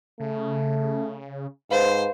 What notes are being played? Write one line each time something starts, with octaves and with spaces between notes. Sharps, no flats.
C#3 A3
G#2 B4 C5 F5 B5